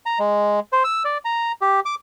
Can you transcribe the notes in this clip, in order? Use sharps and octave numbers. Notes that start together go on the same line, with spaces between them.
A#5
G#3
C5
E6
D5
A#5
G4
D6